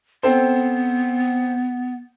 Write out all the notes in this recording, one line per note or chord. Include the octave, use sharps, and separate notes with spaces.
B3 C4 A4 C5